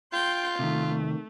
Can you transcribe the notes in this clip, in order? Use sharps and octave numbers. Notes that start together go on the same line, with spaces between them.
F4 G5 C6 G6
C3 D#3 A3